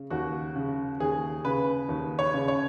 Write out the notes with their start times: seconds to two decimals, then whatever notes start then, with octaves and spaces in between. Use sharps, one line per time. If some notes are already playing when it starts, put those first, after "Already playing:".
Already playing: C#3
0.10 D#2 F#4
0.56 C#3
1.00 D#2 G#4
1.45 C#3 B4
1.89 D#2
2.19 C#5
2.34 C#3
2.48 C#5